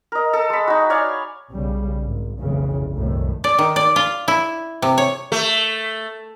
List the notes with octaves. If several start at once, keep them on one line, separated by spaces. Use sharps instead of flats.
A#4 D#5
A4
G#3 B5
D#4 F#4
C#5 D5 F5 G#5
B1 C#3 G3
G#1
F1 B1 G2 C#3 E3
C2 F#2 A2 D#3 A3
D5
D#3
D5
F4
E4
C3
C#5
A3